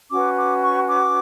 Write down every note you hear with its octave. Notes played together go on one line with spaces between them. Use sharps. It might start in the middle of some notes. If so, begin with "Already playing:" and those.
C#4 F#4 B4 D6
D6
C#6
D6